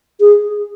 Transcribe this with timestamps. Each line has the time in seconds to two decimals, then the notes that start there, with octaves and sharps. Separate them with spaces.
0.20 G#4